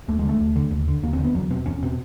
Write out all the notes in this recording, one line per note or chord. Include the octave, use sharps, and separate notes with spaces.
D#2 A3
G#3
D3
A3
D#2
D3
D#2
D3
D#2 A#3
C4
D3
B3
E2 F#3
B2 C4
E2 C#4
B2 C4